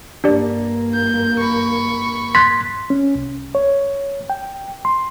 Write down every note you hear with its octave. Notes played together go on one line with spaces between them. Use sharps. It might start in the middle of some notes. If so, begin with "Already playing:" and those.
G2 A#3 D4 G4 D5
G6
B5 C#6
C6 F#6 G#6 A6 B6
C#4
C2
C#5
G5
C6